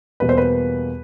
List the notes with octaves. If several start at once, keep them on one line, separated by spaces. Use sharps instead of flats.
E2 B2 G3 A#3 B4
C5
B4